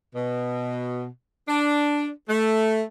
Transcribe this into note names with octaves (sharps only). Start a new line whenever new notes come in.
B2
D4
A3